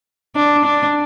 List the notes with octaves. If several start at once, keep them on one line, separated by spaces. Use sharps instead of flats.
D4
D4